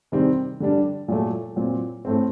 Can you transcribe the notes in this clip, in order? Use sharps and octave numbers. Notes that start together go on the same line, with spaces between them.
C3 D#3 G3 C4
D3 G3 D4
A#2 F#3 A3
A#2 F#3 C4
A2 A3 C4